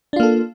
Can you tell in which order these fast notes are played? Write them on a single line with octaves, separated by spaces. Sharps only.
D4 F4 A#3 A4